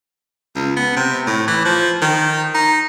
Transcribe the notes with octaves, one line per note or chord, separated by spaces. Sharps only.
C#2
B3
C3
A2
E3
F3
D#3
D#4